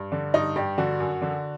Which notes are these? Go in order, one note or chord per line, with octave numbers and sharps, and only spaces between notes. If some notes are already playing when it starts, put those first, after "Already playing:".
Already playing: G2
D3
G2 D#4
G2 G4
D3 F#4
F#2
D3